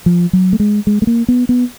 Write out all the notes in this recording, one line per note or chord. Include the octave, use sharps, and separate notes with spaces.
F3
F#3
A3
G#3
G#3
A3
A#3
B3
B3